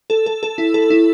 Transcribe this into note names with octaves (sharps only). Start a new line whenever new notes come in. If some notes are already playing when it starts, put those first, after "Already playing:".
A4
A4
A4
E4
A4
E4